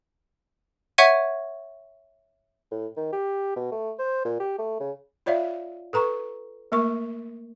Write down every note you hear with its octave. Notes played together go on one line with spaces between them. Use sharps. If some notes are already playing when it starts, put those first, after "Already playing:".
C#5 E5 F#5 C#6 G#6 D#7
A2
D#3
G4
B2
A3
C5
A#2
G4
A3
C#3
F4 C#5 D5 E5 F5
A4 B4 A#5 C#6
A3 A#3 A#4 C#6